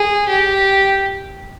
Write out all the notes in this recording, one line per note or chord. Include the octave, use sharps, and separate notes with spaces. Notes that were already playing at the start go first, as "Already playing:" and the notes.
Already playing: G#4
G4